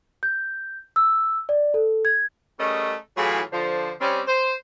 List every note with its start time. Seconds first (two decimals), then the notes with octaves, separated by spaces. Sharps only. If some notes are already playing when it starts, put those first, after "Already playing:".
0.23 G6
0.96 E6
1.49 D5
1.74 A4
2.05 G#6
2.59 G3 A3 C#4 G#4 A#4 D#5
3.17 A2 E3 F#3 F4 G#4
3.52 D3 F3 C5
4.01 G3 C4 C#4
4.28 C5